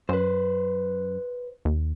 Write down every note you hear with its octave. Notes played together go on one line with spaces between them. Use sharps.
F#2 B4 C5
D#2